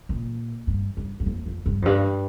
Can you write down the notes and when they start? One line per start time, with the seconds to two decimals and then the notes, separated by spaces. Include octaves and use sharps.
0.09 A#2
0.67 G2
0.97 G2
1.20 G2
1.26 F2
1.46 F2
1.66 G2
1.82 F2
1.85 G2